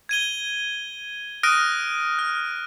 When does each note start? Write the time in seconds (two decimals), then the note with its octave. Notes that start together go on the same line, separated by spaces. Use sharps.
0.09 G#6 D#7 G7
1.43 D#6 F6 F#6 A#6 D7 D#7
2.19 F6